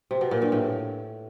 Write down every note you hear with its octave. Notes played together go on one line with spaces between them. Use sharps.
C3
B2
A#2
G2
A2